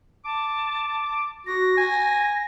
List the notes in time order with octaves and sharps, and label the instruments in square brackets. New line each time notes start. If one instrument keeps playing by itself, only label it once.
[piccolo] A5 [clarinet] D6
[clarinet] F#4 [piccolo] A#6
[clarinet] G#5